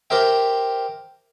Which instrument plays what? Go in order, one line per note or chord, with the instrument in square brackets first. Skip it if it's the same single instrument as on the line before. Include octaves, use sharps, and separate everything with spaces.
[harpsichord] G4 A#4 C5 E5 G5